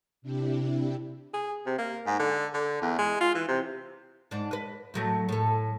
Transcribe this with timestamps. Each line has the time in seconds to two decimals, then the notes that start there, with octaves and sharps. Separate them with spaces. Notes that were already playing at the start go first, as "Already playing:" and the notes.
0.22 C3 D4 E4 G4
1.34 G#4
1.66 C3
1.78 A#3
2.06 G#2
2.19 D3
2.54 D3
2.82 E2
2.98 G#3
3.21 F4
3.35 E3
3.48 C3
4.31 G#2 D4
4.51 B4 D#5
4.94 A2 F#3 A3
5.29 A2 A4